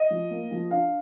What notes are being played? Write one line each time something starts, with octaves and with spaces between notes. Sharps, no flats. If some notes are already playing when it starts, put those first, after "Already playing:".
Already playing: D#5
F3
A#3
F3
D4 F5